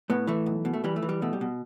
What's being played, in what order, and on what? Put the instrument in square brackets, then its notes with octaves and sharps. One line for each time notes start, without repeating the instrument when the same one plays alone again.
[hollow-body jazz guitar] A2 B3
E3 A3
B1
B2
A3
E3 G3
A3
E3
G3
B2 A3
G3
B2